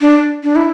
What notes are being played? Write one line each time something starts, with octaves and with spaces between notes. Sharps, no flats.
D4
D4
E4